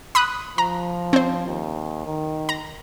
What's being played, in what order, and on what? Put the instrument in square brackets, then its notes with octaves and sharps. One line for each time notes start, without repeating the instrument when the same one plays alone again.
[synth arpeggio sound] B5 D#6 F#6
[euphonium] F3 [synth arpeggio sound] A#5
[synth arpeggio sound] C4 C5
[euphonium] D#2
D#3
[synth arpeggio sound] A#5